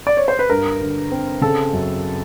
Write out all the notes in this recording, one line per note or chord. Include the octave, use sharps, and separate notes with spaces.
D5
C#5
C5
B4
G2 A#4
D3
C4
C#3 A4
F#2